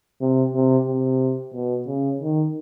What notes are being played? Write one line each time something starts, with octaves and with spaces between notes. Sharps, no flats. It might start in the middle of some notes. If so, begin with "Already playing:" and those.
C3
C3
C3
B2
C#3
D#3